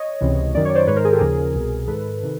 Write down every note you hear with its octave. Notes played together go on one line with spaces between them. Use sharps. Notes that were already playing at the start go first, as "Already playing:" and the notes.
Already playing: C#5 D#5
C#2 C3 E3
F#2 D#3 D5
C#5
C5 D5
G#2 D#3 B4 C#5
A#4 C5
G#4
G4 A4
D#2 C#3 F3 G#4 A#4
C2 B2
G#2 D#3 A4 B4
C3 D#3